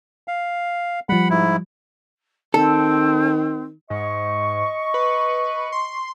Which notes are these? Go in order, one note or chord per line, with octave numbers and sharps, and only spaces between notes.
F5
F3 G3 F#5 B5
G#2 E4
D#3 C4 A4
G#2 D#5 C#6
B4
C6